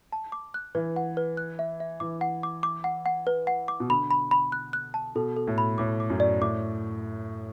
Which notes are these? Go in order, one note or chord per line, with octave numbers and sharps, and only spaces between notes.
A5
D6
F#6
E3 B4
F#5
B4
F#6
E5
E5
E3 D6
F#5
D6
D6
F#5
F#5
B4
F#5
D6
B2
D3 B5
B5
B5
F#6
F#6
A5
B2 A4
A4
A2
B5
A2 D6
D6
F#2
D5
A2 D6